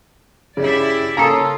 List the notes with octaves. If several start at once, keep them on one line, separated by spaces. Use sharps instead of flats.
C#3 E4 G4 D5
C#3 A#3 C#4 F4 A4 A#5 D#6